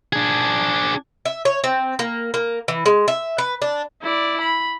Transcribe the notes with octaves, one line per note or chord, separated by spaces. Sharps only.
D4 G#4
E5
C#5
C4
A#3
A#3
E3
G#3
E5
B4
D4
E4 D5
B5